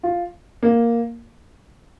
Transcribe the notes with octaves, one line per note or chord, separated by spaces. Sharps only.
F4
A#3